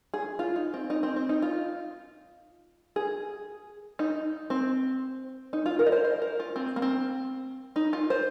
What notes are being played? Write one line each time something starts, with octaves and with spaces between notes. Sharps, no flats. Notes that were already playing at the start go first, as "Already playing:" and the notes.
G#4
F4
D#4
C4
D#4
C4
C4
D#4
F4
G#4
D#4
C4
D#4
F4
A#4
D#5
C5
C5
A#4
F4
C4
A#3
C4
D#4
F4
C5